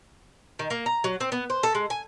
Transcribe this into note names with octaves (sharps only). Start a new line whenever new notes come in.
D#3
A#3
A#5
F#3
C4
B3
C5
A4
G#3
G#5